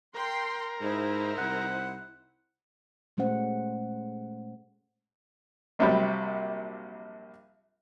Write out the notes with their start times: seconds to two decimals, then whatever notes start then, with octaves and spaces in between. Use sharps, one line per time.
0.14 A#4 G5 C6
0.81 G#2 D#4 E4 C5
1.38 C2 F#5
3.17 A#2 G#3 A3 C#4 C5 F#5
5.79 A#1 C3 F#3 G3 B5